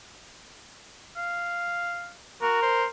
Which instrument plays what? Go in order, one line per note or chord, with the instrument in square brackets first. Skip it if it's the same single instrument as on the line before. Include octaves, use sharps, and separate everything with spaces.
[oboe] F5
[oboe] F#4 [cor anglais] A#4
[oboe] C5